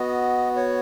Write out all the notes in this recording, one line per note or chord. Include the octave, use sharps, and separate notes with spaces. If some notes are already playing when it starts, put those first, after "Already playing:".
Already playing: B3 F#4 D#5
C#5